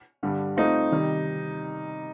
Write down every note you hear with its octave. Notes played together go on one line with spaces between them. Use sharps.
G2 D3 G3
A3 C4 D#4 F4
C3 D#3 G3